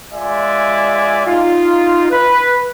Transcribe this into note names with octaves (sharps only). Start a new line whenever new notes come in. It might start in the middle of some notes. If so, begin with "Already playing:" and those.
G#3 F4 D5 E5 G#5
D#4 F4
B4